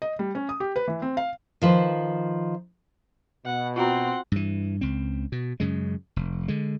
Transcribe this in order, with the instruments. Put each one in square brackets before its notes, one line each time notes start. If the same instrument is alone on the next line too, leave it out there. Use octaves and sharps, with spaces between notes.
[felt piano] D#5
G3
C#4
D#6
G4
B4
E3
C4
F5
[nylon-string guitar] D#3 F3 B4 C5
[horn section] B2 [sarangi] F#5
[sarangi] C4 [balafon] F4 F#4 A#5 [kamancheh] F#5 C6
[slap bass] G2 E3
C#2 C4
B2
F#2 C#3 G#3
F1
D3 G#3